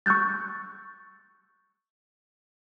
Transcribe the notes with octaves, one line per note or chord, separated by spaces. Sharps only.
C#6 E6 F#6 G6 A6